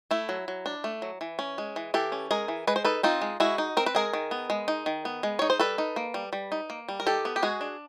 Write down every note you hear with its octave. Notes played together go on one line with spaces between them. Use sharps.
A3 E4
F#3
F#3
D4
A3
F#3
E3
C#4
G#3
E3
E3 G4 A4
C#4
G#3 G#4 A#4
E3
G#3 B4
C5
D#4 A4 B4
C4 D#4 F4
G#3
G#3 E4 F#4
D#4
C4 A#4
B4
G#3 G#4 A#4
D#3
B3
G#3
D#4
D#3
B3
G#3
D#4 C#5
C5
G3 A4 B4
D#4
A#3
G3
G3
D#4
A#3
G3
A#4
D#3 G4 A4
B3
G4
G#3 F#4 G#4
D4